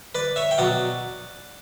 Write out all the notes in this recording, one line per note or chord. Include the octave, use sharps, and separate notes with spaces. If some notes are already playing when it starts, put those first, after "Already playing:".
B4 D5
C#5 E5
G5
B2 F#3 D5 F#5